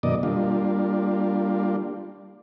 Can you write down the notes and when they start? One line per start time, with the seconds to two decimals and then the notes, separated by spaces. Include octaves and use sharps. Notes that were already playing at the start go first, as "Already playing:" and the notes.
0.03 F#2 B2 D#3 A#3 D5 D#5
0.23 G3 A#3 D4 F4